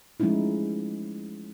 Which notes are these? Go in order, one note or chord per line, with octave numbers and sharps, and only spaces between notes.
F3 G#3 A3 C#4 D#4 E4